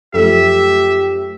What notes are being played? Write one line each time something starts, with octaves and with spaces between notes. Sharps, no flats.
F#2 F3 A3 G4 A4 E5